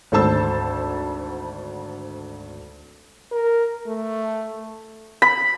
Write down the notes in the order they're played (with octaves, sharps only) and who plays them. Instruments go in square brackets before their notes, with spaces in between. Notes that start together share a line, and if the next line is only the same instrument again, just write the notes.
[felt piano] G#1 D2 A4 C5 A5 E6
[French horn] A#4
A3
[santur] B5